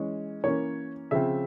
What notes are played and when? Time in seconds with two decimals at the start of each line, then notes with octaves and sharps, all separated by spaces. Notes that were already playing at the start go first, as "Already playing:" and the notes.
Already playing: E3 G#3 C#4
0.44 E3 A#3 C#4 C#5
1.11 C#3 F3 C4 E5